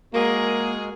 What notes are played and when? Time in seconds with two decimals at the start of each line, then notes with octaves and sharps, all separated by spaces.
0.14 G#3 A#3 F#4 G#4 A#4